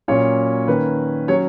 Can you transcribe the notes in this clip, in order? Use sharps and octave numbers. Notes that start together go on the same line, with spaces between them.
A#2 F#3 C#4 C#5
D#3 A#3 C#4 B4
F#3 C#4 C#5